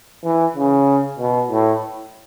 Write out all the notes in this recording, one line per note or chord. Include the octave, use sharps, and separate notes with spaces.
E3
C#3
B2
A2